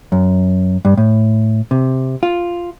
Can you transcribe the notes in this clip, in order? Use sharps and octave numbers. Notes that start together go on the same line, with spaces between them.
F#2
G2
A2
C3
F4